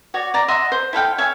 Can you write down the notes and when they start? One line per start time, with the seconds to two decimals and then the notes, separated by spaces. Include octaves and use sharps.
0.14 F#4 C#5 D5
0.34 D5 A#5 D6
0.48 D#5 E5 F#5 C6
0.72 C5
0.93 E4 A4 F5 G5
1.18 C#5 E5 F5 G#5